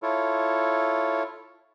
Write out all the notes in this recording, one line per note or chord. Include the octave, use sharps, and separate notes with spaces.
E4 F4 A4 C#5